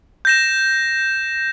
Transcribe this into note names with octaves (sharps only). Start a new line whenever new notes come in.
G6 A#6 E7